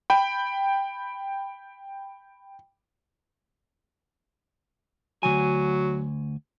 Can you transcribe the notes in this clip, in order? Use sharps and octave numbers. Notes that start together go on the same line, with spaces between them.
G5 B5
D2 E3 F#3 G#5